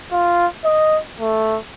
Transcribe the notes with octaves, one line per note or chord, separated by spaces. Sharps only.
F4
D#5
A3